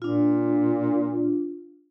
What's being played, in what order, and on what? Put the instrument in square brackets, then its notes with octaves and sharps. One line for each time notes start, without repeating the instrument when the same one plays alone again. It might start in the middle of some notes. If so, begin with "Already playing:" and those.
[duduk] A#2 [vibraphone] D4 F4